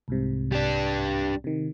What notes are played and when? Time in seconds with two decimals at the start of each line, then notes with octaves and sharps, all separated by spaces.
0.08 C2 G#2 C3
0.52 G3 D4
1.44 C3 D#3